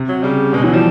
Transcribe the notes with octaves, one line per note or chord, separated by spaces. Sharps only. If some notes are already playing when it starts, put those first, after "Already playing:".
Already playing: C3
F#3
C#3 G3
B2 G#3
E3 F#3
F3 G3